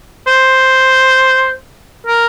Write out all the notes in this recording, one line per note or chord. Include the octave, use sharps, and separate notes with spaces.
C5
A#4